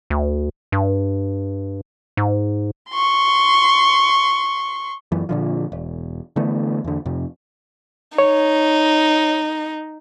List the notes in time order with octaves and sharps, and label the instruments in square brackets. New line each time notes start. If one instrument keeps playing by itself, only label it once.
[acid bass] D2
G2
G#2
[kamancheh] C6 C#6
[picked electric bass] F#2 E3
A#2 D3 F3
E1
D3 E3 A3 B3
E2 D3
F2 C3
[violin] D#4 [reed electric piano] C#5